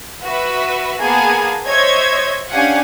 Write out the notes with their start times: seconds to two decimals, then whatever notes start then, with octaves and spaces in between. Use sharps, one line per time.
0.25 F#4 B4 E5
1.00 A#3 B3 G#4 G#5 A5
1.66 C5 C#5 D#5 E5 G#6
2.50 C#4 D4 G4 F5 F#5 G#5